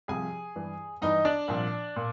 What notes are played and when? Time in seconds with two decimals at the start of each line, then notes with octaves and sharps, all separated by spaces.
0.08 C2 C3 F3 G#4 G#5
0.56 G2 E3
1.02 G2 E3 D#4 D#5
1.25 D4 D5
1.48 C2 A#2 F3
1.96 A#2